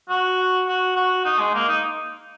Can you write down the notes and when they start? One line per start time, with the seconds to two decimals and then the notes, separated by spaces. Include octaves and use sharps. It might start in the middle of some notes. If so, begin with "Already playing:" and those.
0.09 F#4
0.68 F#4
0.96 F#4
1.25 D#4
1.39 G#3
1.54 A#3
1.68 D#4